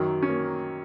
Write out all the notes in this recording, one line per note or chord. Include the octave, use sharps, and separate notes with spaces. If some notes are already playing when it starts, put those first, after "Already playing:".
Already playing: F#2 D#3 F#3
C#4
A#3